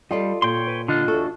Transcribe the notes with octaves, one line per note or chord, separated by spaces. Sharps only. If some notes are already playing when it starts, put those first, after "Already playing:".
G3 F4 A4 D5 D#5
A#2 C#5 G5 C6
B4
D3 D4 F4 D#5
E2 F#4 A4